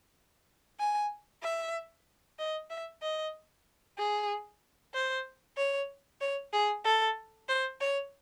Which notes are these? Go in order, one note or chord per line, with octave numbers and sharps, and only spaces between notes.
G#5
E5
D#5
E5
D#5
G#4
C5
C#5
C#5
G#4
A4
C5
C#5